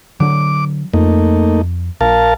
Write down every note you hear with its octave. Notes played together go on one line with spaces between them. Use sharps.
D3 F#3 D6
F2 A3 A#3 D#4
A#1 A#4 F5 A5